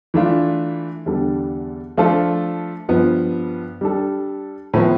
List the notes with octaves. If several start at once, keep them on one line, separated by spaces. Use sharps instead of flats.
E3 A3 D4 F4
E2 D3 G3 D4 A4
F3 A3 D4 F4 A4
G2 F3 B3
G3 D4 A4
A2 F3 B3